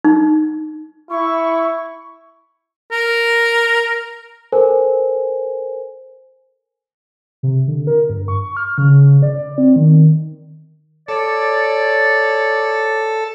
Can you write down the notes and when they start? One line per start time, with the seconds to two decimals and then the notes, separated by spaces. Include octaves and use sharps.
0.05 D#4
1.10 E4 C#6
2.92 A#4
4.52 A4 A#4 C5 G#5
7.43 C3
7.68 D3
7.87 A#4
8.10 G2
8.28 C#6
8.57 F6
8.78 C#3
9.22 D5
9.58 C4
9.76 D#3
11.09 A4 C#5 D5